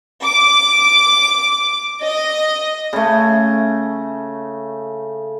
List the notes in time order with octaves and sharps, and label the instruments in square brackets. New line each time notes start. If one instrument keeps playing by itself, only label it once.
[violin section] D6
D#5
[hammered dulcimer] C#3 A3